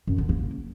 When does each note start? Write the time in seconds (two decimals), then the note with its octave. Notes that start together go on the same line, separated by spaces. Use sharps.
0.07 F#2
0.18 D3
0.29 A#3